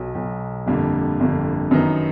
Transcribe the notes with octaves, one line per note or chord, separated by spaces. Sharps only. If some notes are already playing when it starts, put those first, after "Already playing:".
Already playing: B1 B2 F#3
B1 B2 F#3
G1 F2 D3 G3 A#3
G1 F2 D3 G3 A#3
F#2 D#3 F#3 B3 D#4